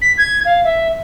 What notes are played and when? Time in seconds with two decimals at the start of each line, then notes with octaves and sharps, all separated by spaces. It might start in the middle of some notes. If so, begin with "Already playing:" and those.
0.01 B6
0.18 G#6
0.45 F5
0.64 E5